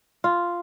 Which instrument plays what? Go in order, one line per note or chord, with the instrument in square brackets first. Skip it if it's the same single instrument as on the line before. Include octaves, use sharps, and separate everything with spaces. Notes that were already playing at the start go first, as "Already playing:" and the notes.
[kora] F4